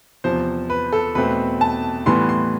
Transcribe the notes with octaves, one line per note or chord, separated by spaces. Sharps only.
E2 C3 F3 C5
B4
A4
E2 B2 A3 C4 B4
A5
A2 E3 G3 B3 C6
C6